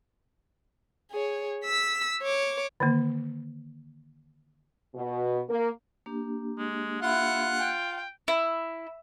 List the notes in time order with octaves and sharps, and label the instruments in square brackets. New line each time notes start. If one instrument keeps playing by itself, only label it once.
[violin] G#4 C#5
E6 B6
C#5 D6
[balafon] D3 D#3 A#3
[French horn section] B2
A#3
[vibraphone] A#3 D4 G4
[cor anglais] G#3
[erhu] E4 [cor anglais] F4 [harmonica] F#5
[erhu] G5
[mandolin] E4